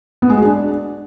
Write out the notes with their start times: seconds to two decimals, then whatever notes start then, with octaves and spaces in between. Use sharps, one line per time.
0.22 B3
0.30 G#3
0.37 F#4
0.45 D4